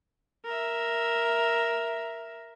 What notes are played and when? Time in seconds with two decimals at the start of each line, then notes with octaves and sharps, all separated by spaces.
0.45 A#4 E5